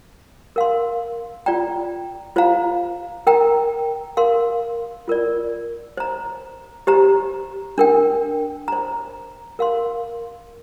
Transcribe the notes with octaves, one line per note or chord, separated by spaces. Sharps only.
A#4 F5 C6
F4 D5 G5 A#5
F4 C5 F5 A#5
A#4 G5 A#5
A#4 F5 C6
F4 A#4 D5
C5 A#5
G4 C5 A#5
D4 A#4 G5
C5 A#5
A#4 F5 C6